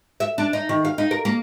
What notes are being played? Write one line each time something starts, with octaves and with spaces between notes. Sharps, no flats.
E5
D4
D#4
D#3
F5
D#4
A#4
A#3